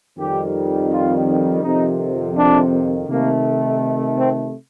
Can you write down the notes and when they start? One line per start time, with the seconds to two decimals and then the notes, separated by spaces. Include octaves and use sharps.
0.17 F2 D#3 G3 G4
0.89 F4
1.62 F2 C3 D#3 D#4
2.35 D4
3.07 C3 D#3 A3 A#3
4.15 C4